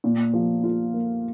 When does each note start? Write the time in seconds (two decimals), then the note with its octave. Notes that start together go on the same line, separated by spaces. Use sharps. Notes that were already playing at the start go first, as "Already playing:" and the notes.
0.04 A#2
0.33 F3
0.64 F4
0.93 A#3